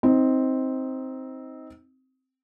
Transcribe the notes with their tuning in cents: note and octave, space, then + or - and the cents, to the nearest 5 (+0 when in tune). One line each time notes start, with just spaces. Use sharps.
C4 +0 D#4 +20